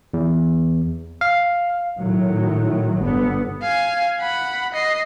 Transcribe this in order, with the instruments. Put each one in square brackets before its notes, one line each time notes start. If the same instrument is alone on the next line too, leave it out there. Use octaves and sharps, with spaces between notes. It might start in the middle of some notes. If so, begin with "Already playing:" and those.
[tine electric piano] E2
F5
[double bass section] A2 D#3 F#3
G1 D3 B3
[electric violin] F5 G#5
F#5 B5
D#5 C7